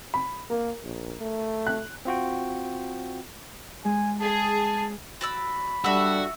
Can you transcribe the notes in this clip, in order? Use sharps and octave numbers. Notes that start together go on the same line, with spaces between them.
B5
A#3 A#4
A#1
A3
F#6
C4 F4 F#4 G5
G#3 G#5
G#4 A5
F#4 D5 B5 E6
G3 D4 F#4 A4 E5 E6